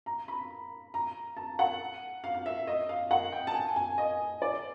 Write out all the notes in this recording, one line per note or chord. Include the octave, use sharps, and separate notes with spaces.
A#5
B5
A#5
A5
F#5
F5
F5
E5
D#5
F5
F#5
G5
A5
G#5
G#5
D#5
D5